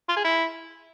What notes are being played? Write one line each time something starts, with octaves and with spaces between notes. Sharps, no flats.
F4
G#4
E4